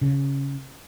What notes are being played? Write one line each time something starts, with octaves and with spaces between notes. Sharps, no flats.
C#3